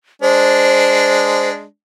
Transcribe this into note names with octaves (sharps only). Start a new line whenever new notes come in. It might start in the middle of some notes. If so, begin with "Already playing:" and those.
G#3 D4 C5